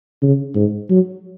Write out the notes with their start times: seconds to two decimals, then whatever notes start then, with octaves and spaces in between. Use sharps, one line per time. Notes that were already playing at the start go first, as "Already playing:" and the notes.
0.23 C#3
0.55 G#2
0.90 F#3